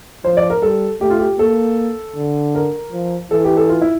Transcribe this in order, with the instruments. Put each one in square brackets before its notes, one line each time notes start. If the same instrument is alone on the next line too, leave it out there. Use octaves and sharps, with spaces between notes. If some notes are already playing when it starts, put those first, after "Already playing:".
[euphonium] F3 [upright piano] C5
[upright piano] D5
A#4
[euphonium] G3 [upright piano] A4
[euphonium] A3 [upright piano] G4
[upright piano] F4
G4
[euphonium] A#3 [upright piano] A4
[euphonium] D3
[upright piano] A#4
[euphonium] F3
[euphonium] E3 [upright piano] A4
[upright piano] G4
A4
F4
E4